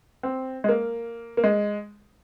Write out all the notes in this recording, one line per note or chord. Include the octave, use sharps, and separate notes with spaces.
C4
G#3
A#3
A#3
G#3